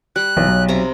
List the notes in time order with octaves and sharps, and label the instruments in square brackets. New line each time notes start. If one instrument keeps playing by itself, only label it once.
[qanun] G3 [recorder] F#6
[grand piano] B1 [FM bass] E3
[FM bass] F#3
[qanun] C3 A#5